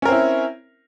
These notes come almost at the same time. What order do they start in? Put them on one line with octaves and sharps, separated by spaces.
C#4 A#4 C4 E4